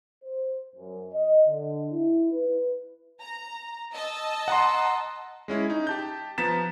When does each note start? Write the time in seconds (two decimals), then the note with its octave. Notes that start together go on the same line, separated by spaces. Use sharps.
0.24 C5
0.76 F#2
1.13 D#5
1.47 D3
1.91 E4
2.33 B4
3.20 A#5
3.94 D#5 A5 E6
4.48 F#5 A#5 C6
5.48 G#3 C#4 E4
5.70 D#4
5.87 G4 A5 G6
6.38 F3 B3 A#5 A6 B6 E7